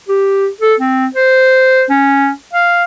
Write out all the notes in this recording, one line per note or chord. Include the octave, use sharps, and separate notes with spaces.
G4
A4
C4
C5
C#4
F5